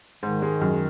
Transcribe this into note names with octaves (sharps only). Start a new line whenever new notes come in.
G#2 D#3
G#3
F#2